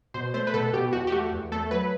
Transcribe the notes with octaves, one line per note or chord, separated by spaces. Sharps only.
B2 C5
A3 C5
B4
B2 A4
B2 G4
E2 F#4
G4
A3 F#4
E2
A3 A4
F#3 B4